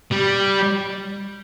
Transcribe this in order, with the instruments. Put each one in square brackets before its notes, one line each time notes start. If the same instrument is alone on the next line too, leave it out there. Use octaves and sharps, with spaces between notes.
[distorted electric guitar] G3